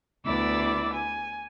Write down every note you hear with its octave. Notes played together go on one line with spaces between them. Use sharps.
D2 B3 E4 D5 D6 E6
G#5